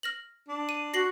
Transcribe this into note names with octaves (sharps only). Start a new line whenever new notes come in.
F6 A#6 F#7
D4
D#7
F#4 A#6 C7 F#7